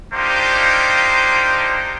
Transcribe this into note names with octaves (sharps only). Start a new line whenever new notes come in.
A#3 D4 D#4 F4 G4 C5